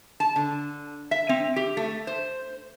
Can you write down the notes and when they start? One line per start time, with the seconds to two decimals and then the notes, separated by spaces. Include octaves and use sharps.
0.20 A5
0.36 D3
1.11 E5
1.29 C4
1.56 G4
1.77 A3
2.07 C5